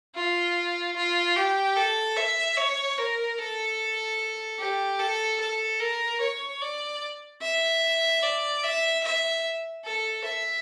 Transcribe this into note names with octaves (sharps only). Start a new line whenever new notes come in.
F4
F4
G4
A4
E5
C#5
A#4
A4
G4
A4
A4
A#4
C#5
D5
E5
D5
E5
E5
A4
E5